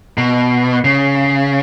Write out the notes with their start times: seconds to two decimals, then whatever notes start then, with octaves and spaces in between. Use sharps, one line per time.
0.18 B2
0.85 C#3